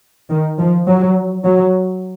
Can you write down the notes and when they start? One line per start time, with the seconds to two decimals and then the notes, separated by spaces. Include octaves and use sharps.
0.30 D#3
0.59 F3
0.87 F#3
1.44 F#3